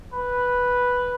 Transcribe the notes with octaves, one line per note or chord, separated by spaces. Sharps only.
B4